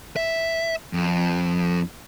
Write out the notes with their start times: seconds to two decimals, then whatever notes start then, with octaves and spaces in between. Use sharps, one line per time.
0.16 E5
0.93 F2